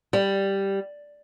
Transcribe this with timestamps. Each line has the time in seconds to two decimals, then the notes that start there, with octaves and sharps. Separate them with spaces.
0.13 G3